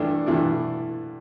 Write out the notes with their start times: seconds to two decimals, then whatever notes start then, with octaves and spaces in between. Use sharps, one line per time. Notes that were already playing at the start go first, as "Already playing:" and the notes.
Already playing: G2 E3 A3 D4 A4
0.26 G2 E3 A3 D4